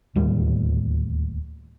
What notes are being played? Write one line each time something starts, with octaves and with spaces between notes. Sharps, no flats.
D1 D#2 A2 G3